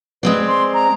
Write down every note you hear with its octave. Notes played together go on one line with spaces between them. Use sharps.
G#3 C4 B4 D5
C6
A#5